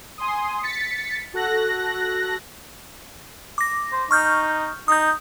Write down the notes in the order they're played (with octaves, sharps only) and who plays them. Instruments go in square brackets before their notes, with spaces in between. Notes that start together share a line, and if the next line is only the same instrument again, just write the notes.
[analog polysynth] G#5 C6 D#6
A6 B6 C#7
F#4 A4 F#6 A#6
[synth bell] D6 A#6
[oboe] C5
[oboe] D#4 [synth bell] C#6 F6 G6
[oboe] D#4 [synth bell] D#6 G6